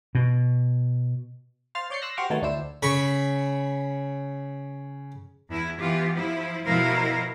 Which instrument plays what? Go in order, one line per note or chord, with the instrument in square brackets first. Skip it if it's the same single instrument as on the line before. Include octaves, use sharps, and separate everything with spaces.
[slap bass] B2
[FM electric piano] C5 F5 F6 A6
C#5 D5 G6 A6 C7 C#7
C6 E6 F#6 A#6
F#4 G4 C5 C#6 D6 F6
D#3 F#3 A3 B3 C#5 A5
D2 D4 E4 C5 E6
[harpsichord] C#3 B5 C#6
[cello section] E2 E4
E3 B3 F4 G4
F3 E4
B2 F3 E4 A#4 F5